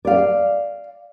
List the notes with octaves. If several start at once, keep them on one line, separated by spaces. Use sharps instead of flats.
D5 F5